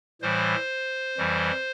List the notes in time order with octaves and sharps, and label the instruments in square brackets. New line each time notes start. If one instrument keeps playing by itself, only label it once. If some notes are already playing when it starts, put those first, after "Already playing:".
[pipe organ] A2 E3 G3 C5
F2 E3 G3